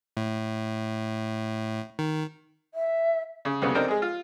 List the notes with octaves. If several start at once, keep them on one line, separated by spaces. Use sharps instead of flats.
A2
D#3
E5
C#3
C2 F2 C#3 B3
C4 D4 D#4 A4 A#4 C5
G#3 G#4
F4